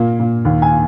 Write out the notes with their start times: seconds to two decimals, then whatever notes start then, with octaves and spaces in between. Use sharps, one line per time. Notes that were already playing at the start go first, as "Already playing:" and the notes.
Already playing: A#2 A#3
0.19 A#2
0.45 D#2
0.62 G#5